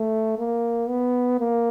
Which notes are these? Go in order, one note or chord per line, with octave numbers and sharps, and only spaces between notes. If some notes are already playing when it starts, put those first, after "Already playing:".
Already playing: A3
A#3
B3
A#3